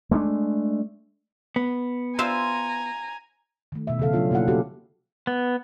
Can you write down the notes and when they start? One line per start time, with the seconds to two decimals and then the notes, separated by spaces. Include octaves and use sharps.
0.11 G#3 A3 C4 D4
1.56 B3
2.19 F4 C5 E5 G#5 A#5
3.72 D#3 A3
3.87 B2 E5
3.99 C#3 F3 A4 F5
4.13 F#3 C#4 D4 F4 C#5
4.31 B2 A#3 E4 F4 F#5
4.47 G#3 C4 C#4 F#4 G4 A4
5.27 B3